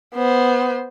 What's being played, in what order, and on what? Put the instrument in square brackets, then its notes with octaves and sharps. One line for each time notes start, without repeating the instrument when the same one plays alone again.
[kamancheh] B3 C5